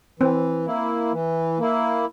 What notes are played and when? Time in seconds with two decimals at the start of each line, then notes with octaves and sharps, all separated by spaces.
0.20 E3 C4
0.66 A#3 E4
1.12 E3
1.59 A#3 E4